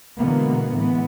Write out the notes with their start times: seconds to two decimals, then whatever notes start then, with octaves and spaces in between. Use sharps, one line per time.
0.18 B2 D3 E3 G#3 A#3 B3
0.75 A2 E3 G#3 B3